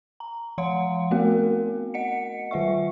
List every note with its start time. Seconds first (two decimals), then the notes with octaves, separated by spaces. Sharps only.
0.20 A#5
0.58 F3 F5 F#5 C6
1.11 A3 B3 C4 F#4 A#4
1.94 D#5 F#5 C#7
2.51 D#3 F4 E5 C#6